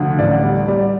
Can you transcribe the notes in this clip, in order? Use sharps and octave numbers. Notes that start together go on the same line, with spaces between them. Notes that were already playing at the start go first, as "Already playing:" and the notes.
Already playing: D2 F3
A1 D5
G3
G3